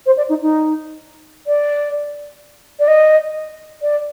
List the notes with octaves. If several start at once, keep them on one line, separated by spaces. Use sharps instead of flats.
C5
D5
D#4
D#4
D5
D5
D#5
D5